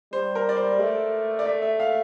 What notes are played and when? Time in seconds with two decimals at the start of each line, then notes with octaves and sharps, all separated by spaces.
0.12 G3 C5
0.35 A#4
0.49 D5
0.57 C5
0.80 A3
1.39 D5
1.46 E5
1.62 E5
1.80 F5